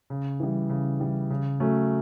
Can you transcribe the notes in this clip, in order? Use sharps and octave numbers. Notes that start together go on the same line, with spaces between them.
C#3
E3 G3
C#3
E3 G3
C#3
F#3 A3 C#4